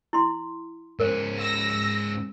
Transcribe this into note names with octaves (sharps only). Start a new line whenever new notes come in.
E4 C6
G#2 C#4 A#4 C5
E6 A#6